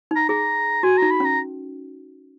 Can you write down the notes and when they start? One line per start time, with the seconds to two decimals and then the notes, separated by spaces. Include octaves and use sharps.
0.11 D#4 A#5
0.29 G#4 A#5
0.83 F#4 G#5
0.98 D#4 A#5
1.11 B5
1.20 C#4 A#5